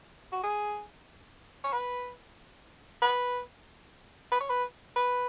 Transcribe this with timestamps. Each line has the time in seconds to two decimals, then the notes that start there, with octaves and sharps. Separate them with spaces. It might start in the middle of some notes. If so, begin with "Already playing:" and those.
0.32 F#4
0.44 G#4
1.64 C#5
1.73 B4
3.02 B4
4.32 B4
4.40 C#5
4.50 B4
4.96 B4